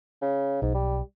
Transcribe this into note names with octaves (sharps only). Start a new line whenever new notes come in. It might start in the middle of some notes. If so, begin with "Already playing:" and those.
C#3
B1 G#2
G3